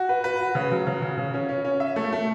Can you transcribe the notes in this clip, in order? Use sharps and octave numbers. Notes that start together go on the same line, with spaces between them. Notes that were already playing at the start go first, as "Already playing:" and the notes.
Already playing: F#4
B4
B4
F#4
C#3
F#3
C#3
C#3
C#3
C#4
C#4
C#4
E5
A3
A3